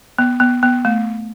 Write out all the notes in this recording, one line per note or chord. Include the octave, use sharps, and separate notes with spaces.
B3
B3
B3
A3